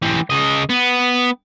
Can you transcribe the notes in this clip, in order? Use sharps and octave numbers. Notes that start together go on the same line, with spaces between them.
E3 G4
C#3 D#5
B3